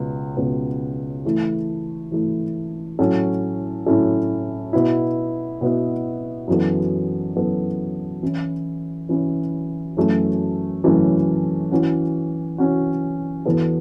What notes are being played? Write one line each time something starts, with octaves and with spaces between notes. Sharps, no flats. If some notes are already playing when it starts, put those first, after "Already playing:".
Already playing: C#2 B2 B3
C#2 B2 B3
E3 A3 E4
E3 A3 E4
A2 F#3 C#4 E4 A4
A2 F#3 C#4 E4 A4
B2 B3 E4
B2 B3 E4
F#2 E3 B3 A4
F#2 E3 B3 A4
E3 C#4 E4
E3 C#4 E4
F#2 E3 A3 C#4 A4
F#2 E3 A3 C#4 A4
E3 C#4 F#4
E3 C#4 F#4
E2 E3 B3 F#4 A4